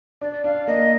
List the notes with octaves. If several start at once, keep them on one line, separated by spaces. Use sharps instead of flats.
D4 D5
D4 F5
A#3 D#5